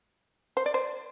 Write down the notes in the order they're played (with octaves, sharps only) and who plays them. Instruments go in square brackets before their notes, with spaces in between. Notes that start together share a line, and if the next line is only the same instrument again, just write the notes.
[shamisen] C5
D5
C5